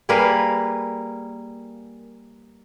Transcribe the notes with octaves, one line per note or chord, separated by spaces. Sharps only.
G3 A#3 G#4 A#4 B4 F5